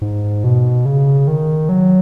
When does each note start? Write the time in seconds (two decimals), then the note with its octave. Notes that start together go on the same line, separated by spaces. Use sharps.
0.01 G#2
0.44 B2
0.85 C#3
1.28 D#3
1.69 F#3